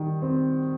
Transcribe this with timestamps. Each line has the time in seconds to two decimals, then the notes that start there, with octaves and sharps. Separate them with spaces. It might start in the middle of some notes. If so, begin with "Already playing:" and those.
Already playing: D#3 G3
0.22 C4